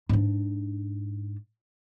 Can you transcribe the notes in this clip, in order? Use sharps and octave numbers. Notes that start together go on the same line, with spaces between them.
G#2 D4